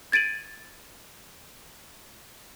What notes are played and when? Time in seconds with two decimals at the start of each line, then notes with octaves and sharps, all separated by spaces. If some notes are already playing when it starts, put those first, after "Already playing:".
0.12 G#6 A6 D7 D#7 F#7